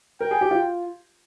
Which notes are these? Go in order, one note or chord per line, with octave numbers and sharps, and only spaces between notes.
A#4 G5
G#4
G4
F4